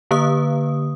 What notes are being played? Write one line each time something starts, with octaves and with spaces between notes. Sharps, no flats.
D3 A#3 B4 D#6